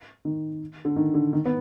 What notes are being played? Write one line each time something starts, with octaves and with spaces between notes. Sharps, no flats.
D#3
D3
D#3
D3
D#3
B3